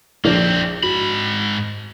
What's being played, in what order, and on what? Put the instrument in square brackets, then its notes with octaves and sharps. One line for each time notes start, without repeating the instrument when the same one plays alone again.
[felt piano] A#1 D4 [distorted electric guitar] A#3 C4
[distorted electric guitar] G#2 B5 [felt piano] F#4